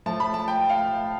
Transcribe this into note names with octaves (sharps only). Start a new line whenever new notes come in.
A2 F3 A3 A5
B5
A5
G5
F5